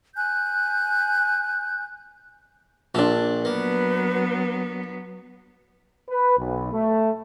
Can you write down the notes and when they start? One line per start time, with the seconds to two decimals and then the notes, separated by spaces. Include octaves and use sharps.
0.15 G#5 F#6 G6
2.95 A#1 A#2 F3 D4 A4
3.45 F#3 A#3 B3 B4
6.09 B4
6.37 B1
6.72 A3